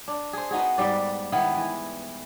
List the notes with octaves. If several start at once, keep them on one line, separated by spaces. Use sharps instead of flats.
D4
G#4 C5
B3 D#4 F#4 G#4
G#2 G3 B4 D5
D#3 B3 E4
E3